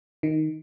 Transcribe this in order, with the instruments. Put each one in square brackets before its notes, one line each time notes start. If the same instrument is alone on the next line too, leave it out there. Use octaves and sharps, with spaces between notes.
[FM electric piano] D#3